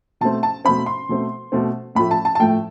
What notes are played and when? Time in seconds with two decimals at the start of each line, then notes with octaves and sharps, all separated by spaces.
0.21 B2 A3 C4 A5
0.43 A5
0.65 B2 A3 C4 B5
0.86 C6
1.09 B2 A3 C4
1.52 B2 A3 C4
1.95 A2 F3 A3 B5
2.11 A5
2.25 A5
2.35 A5
2.40 A2 F3 A3 G5